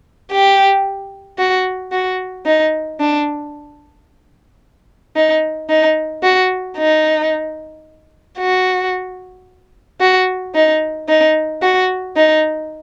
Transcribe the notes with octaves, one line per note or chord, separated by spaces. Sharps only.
G4
F#4
F#4
D#4
D4
D#4
D#4
F#4
D#4
F#4
F#4
D#4
D#4
F#4
D#4